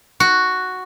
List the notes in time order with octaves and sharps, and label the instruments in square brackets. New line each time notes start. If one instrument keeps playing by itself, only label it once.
[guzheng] F#4